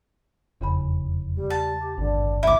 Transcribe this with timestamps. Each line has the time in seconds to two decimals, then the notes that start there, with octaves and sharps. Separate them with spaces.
0.61 F1 E2 C#3 B5
1.35 G3
1.50 A5
1.79 G4
1.98 G#1 G2 D3
2.43 A1 D2 E4 E5 D6